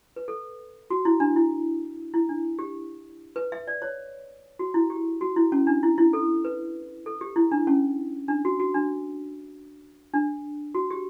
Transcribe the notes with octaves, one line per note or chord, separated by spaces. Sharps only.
B4
A4
F#4
E4
D4
E4
E4
D4
G4
B4
E5
D5
C#5
F#4
E4
G4
F#4
E4
C#4
D4
E4
E4
A4
B4
A4
G4
E4
D4
C#4
D4
F#4
F#4
D4
D4
F#4
G4